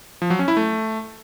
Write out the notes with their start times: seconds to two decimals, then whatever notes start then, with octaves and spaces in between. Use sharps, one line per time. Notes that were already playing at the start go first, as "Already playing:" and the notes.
0.22 F3
0.30 F#3
0.39 C#4
0.48 E4
0.57 A3